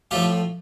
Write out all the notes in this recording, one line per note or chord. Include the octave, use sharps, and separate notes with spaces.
A2 F3 F4 G4